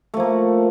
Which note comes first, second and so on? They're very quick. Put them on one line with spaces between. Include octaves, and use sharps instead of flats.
A3 F3 A#3